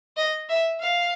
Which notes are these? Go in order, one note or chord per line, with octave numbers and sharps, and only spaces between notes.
D#5
E5
F5